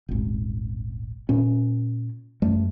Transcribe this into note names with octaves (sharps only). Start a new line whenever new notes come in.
D#1 G#1
A#2 C#4
F#2 G3 A3